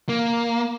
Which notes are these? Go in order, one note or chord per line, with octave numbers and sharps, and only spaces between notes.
A#3